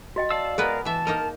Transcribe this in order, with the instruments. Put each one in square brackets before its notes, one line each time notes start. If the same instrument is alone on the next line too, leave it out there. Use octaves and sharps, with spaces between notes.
[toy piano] F#4 D#5 G5
[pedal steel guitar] D5 F5 E6 [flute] A5
[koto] G#3 B3 B4 [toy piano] G#4 [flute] A#4
[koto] E3 E5 [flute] A5
[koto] A#3 D#4 D#5 [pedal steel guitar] A#4